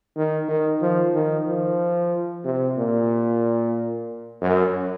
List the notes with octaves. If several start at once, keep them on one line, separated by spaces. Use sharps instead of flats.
D#3
D#3
F3
D#3
F3
C3
A#2
F#2